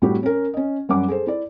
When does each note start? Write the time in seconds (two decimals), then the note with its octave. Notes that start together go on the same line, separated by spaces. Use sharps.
0.02 A2 G3 C4 F#4 G4
0.23 C#4 A#4
0.54 C#4 D#5
0.89 F#2 G3 C#4 F#5 D6
1.08 G#4 A4 C5
1.27 E4 D5